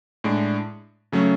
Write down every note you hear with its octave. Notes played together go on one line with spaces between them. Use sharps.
A2 G#3 D4
C#3 F#3 A3 C#4